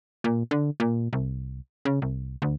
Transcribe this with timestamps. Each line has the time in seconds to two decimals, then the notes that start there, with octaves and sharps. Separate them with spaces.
0.24 A#2
0.51 D3
0.80 A#2
1.13 C2
1.85 C#3
2.02 C2
2.42 D2